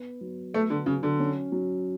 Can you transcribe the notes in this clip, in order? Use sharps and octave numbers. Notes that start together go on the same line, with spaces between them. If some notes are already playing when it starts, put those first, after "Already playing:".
Already playing: B3
F#3
A3 B3
D3
C#3 F#3
D3
C#4
F#3